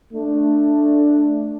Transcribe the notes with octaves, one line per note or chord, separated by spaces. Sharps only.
A3 D4